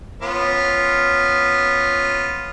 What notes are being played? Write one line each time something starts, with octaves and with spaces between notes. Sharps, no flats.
B3 C#4 F4